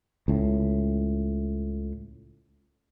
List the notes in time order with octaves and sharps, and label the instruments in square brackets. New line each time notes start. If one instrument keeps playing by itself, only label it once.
[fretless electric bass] C#2 A2